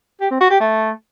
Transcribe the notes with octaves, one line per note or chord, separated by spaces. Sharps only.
G4
C4
F#4
G4
A3